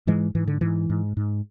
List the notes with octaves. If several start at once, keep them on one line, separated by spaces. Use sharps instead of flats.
G#2 E3 G#3
G#2 E3
D3
G#2 E3
G#2
G#2